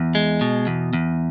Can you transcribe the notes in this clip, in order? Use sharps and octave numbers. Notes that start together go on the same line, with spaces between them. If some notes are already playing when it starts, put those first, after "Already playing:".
Already playing: E2
G#3
B2
E2
E2